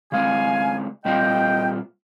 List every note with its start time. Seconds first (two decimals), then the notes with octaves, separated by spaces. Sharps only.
0.12 C#3 G#3 C4 F5 G#5
1.05 A#2 G3 C4 F4 D#5 G5